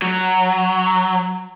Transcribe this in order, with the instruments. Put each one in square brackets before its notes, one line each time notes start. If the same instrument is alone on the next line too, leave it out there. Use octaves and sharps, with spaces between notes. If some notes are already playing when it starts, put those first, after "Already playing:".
[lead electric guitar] F#3